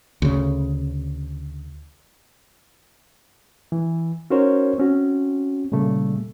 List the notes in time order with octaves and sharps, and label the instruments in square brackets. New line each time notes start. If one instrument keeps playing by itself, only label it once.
[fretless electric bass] D2 C#3
[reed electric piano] E3
C#4 D#4 F#4 A#4 C5 C#5
C4 C#4 F#4
A#2 C#3 G3 A3